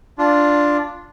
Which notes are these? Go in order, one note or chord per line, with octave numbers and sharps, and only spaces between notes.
D4 F4